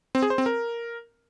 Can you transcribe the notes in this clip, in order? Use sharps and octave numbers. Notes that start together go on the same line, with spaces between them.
C4
G#4
C5
C4
A#4